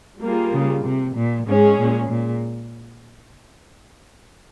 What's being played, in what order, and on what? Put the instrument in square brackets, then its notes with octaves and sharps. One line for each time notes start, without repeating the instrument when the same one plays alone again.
[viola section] G3 A#3 F4 G#4
[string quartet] C#3
C3
A#2
[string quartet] G#2 [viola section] G#3 C#4 G#4
[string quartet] A#2
A#2